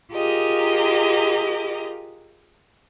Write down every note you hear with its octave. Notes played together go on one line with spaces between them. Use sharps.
F4 G4 G#4 A#4 D#5